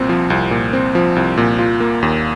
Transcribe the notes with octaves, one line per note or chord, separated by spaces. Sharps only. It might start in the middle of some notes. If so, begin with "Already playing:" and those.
Already playing: C2 A#2 C4
F3
C2
A#2
C4
F3
C2
A#2
F4
A#3
D#2